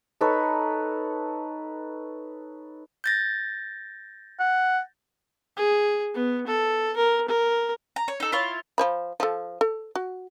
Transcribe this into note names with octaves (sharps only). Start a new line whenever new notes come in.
D#4 A4 B4 C#5
G6 A6 A#6
F#5
G#4
B3
A4
A#4
A#4
A#5
C#5
D#4 A4
E4 F4 C#5
F3 C5 B5
F3 A4
A4
F#4